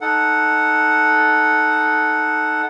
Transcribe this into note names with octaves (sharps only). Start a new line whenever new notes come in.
D#4 A4 F#5